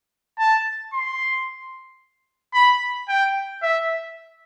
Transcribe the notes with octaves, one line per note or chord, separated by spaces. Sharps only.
A5
C6
B5
G5
E5